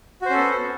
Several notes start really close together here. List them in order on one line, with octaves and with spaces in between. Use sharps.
F#4 C5 C#4 A4 B3